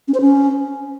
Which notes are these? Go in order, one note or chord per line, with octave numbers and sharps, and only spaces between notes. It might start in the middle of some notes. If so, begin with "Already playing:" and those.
C#4
C5
C#4